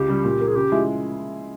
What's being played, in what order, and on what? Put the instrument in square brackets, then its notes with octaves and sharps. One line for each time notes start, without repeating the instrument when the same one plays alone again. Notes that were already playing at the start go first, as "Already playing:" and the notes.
Already playing: [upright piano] C#2 [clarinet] G4
[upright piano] C#3 G3
A#2
F3 A#3
[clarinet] G#4
[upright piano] C#3 [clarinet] G4
[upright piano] F3 G#3 E4